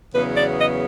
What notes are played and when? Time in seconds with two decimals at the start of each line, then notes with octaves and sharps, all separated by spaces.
0.14 E2 C#3 F#3 B3 B4
0.36 D5
0.58 D#5